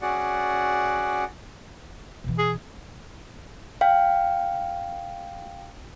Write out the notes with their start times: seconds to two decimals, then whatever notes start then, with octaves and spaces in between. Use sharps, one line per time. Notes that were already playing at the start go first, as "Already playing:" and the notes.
0.01 C#4 F#4 G#4 D5 F#5
2.24 B2 E3
2.38 G#4
3.81 F5 G5